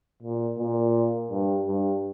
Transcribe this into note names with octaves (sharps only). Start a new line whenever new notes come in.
A#2
A#2
G2
G2